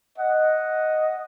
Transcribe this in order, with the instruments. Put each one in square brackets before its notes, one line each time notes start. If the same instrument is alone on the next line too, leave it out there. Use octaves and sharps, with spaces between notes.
[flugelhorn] D#5 [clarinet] F#5